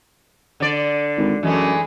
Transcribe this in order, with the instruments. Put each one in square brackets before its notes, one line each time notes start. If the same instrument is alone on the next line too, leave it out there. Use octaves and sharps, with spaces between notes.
[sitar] D3 D5
[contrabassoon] G#1
[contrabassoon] F#2 [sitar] E3 G#3 A3